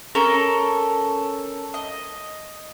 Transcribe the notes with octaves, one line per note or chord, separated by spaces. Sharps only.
C#4 A4 A#4
D#5